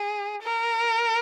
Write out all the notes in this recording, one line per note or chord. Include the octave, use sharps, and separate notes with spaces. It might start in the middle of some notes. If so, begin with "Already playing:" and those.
Already playing: G#4
A#4